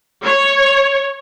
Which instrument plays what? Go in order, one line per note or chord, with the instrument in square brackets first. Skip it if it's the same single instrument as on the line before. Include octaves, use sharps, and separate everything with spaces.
[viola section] C#5